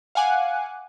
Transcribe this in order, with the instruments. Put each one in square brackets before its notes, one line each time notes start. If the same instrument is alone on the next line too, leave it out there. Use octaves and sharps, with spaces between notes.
[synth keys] F5 F#5 G#5 D6 F#6